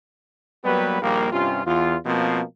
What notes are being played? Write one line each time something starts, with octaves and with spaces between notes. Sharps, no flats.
F#3 G3 A#3 B3 G4 B4
A#1 D#2 G3 A#3
G2 C3 C#4 F4
E2 F4
B2 F3 A#3 C4